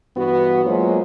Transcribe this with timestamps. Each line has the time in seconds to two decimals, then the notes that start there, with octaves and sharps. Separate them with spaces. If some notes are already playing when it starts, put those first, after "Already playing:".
0.17 G2 E3 B3 F#4
0.65 F#3 G#3 A#3 F4 C5